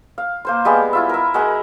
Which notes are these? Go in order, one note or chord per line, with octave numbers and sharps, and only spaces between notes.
F5
A#3 C5 C6
G3 G#3 B3
E4 F4 E5
A#4 E5
G#3 F#4 A#4 F#5